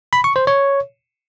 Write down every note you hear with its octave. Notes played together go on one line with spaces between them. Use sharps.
B5
C#6
C5
C#5